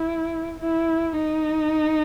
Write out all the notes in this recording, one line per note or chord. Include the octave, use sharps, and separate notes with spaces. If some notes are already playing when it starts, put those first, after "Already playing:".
Already playing: E4
E4
D#4